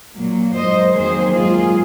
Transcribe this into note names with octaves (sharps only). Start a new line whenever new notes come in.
A#2 F#3 A#3
G#2 F#3 A#3 C5 D#5
F2 D#3 F#3 A#3 G#4 C5
G#2 F#3 A#3 F4 G#4